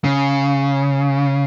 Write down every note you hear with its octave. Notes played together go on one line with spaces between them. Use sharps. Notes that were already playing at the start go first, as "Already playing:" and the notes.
C#3